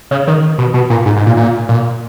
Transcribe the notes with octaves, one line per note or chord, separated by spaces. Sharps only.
C#3
D#3
B2
B2
A#2
G#2
G#2
A#2
A#2
A#2